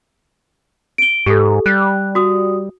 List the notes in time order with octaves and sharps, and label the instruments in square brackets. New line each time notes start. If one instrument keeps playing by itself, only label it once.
[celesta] D7 G7
[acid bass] G#2 [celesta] G4 A4
[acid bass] G3 [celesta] F#6
[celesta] F#4 D#6